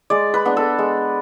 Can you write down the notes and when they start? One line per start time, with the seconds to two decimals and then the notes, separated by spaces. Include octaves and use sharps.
0.10 G#3 D5
0.34 B4
0.45 B3 D4
0.57 A4
0.79 G#3